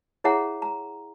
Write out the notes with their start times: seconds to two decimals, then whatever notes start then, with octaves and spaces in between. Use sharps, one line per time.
0.24 E4 G#4 C#5 E5 F#5 A#5
0.62 A#5